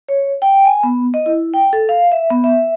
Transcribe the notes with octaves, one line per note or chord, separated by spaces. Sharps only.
C#5
G5
G#5
B3
D#5
E4
G5
A4
F5
E5
B3
E5